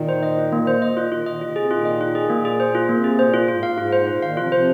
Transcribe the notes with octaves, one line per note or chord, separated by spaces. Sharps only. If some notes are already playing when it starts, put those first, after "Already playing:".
Already playing: A#2 D#3
C5
D#5
F4
A#2 A#3
C5
A#2 D#5
F4
A#2 D#3 F4
A#2 D#3 D#5
C3 F4
C3 G#4
A#2 D#3 F4
D#5
F4
G#4
A#2 A#3
G#4
C5
F4
C3 A#3
G#4
A#2 C5
F4
G#2 F4
F5
G#2
F4
C5
A#2 F4
A#2 D#3 F5
C3 F3 F4
C3 F3 C5